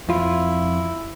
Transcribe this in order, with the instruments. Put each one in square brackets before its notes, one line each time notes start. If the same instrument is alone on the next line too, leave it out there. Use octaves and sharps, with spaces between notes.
[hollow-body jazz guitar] F2 F4 [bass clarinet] E4